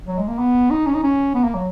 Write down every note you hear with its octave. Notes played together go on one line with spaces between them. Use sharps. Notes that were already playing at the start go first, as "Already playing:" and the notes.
F#3
G#3
A#3
B3
D#4
C#4
D#4
C#4
B3
A#3
F#3